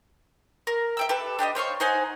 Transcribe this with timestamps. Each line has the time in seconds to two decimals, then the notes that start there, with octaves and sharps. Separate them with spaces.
0.67 A#4
0.97 E5 G5 E6
1.09 G4 A4 B4
1.39 D4 G4 C#5 D#5
1.55 C5 C#5 F5 C#6
1.80 D#4 C5 F#5 G#5